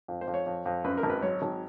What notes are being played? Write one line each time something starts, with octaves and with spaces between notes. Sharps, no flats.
F2
C5
F2
C#5
F2
F2
F#2 B4
A#4
G#1
B4
F#3 C#5
G#1